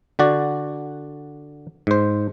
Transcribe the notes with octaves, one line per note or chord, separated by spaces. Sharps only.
D3 F#4 D5
G#2 C5